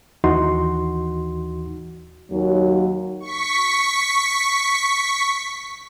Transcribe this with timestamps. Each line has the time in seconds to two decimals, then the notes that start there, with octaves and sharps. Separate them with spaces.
0.24 D#2 E3 D#4 F#4 C6
2.30 D#2 F#3
3.20 C#6 B6